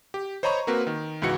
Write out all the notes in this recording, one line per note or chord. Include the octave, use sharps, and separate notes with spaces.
G4
C5 C#5 D#5 A#5 B5 C#6
A#3 C4 F#4 A#4 B4
D#3
C#2 G#2 E3 F#4 C#7